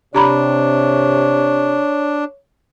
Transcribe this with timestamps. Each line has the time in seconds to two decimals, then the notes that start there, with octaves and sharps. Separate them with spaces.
0.15 C3 D4 G4 C#5 A#5 B5